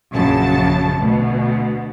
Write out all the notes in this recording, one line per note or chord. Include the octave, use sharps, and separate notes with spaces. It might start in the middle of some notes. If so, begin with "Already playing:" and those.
A#1 F#2 C#3 F#3 A5
D2 B2